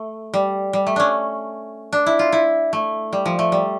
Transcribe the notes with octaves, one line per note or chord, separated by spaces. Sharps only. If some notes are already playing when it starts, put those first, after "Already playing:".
Already playing: A3
G3
G3
A3
C#4 D4
D4
E4
F4
E4
A3
G3
F3
A3
G3